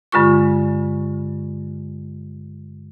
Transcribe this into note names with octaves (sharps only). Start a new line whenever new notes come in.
G2 D3 G#3 F4 C#6